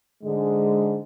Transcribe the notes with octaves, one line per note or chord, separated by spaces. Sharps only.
G#2 D3 G#3